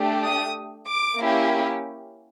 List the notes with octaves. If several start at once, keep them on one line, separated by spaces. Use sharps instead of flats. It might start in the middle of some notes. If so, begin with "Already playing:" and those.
Already playing: A3 D4 G4
D#6
D6
A#3 C#4 E4 G4